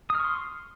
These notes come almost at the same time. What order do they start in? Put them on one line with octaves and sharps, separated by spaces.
D#6 F6 C#6 C6